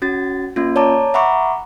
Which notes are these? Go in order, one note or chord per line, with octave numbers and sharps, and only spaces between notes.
C#4 F#4 A6
A#3 C#4 F4
C#5 D5 A5 A#5 D6
E5 F#5 A#5 B5 C#6 D6